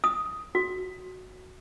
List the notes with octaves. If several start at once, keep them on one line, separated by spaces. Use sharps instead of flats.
D#6
F#4